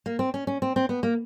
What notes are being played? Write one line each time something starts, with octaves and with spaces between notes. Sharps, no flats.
A#3
C4
C#4
C#4
C4
C4
B3
A#3